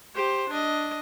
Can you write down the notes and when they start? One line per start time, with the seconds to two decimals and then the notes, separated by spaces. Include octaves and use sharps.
0.15 G4 C5
0.50 D4 D#5